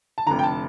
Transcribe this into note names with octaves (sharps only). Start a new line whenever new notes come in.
A5
F1 F2 D3 A#5
G5
A5